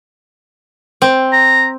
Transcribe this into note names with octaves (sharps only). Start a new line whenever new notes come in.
C4
A#5